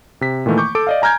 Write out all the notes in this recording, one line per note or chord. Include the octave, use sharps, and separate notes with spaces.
C3 B6
A#2 D#3 E3 A3 A#3
C#6 D6 G6
A4 D6 D7
D5 D#5 F5
G#5 A#5 F6 G6 G#6